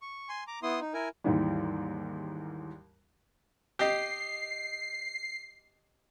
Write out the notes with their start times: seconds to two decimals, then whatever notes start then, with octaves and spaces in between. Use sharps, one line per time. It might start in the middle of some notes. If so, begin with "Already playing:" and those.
0.02 C#6
0.29 G#5 C6
0.47 A#5 D6
0.63 B3 E4 C6 D#6
0.81 D#4
0.94 E4 A#4 G#5
1.24 D#2 G#2 E3 G3
3.79 G4 D#5 C7